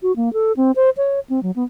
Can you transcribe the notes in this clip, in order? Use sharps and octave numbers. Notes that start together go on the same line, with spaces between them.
F#4
A#3
A4
C4
C5
C#5
C4
F#3
B3